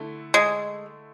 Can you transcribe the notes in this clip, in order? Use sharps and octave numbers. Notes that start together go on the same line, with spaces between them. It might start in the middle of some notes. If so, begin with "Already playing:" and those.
Already playing: D3 A3 E4
G#3